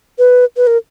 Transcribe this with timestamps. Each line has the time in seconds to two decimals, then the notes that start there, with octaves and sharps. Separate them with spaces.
0.19 B4
0.57 B4
0.67 A#4